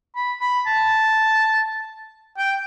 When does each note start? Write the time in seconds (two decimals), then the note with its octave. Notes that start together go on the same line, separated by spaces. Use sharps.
0.16 B5
0.40 B5
0.66 A5
2.38 G5